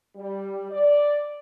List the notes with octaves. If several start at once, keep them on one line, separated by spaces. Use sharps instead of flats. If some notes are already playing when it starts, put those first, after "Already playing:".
G3
D5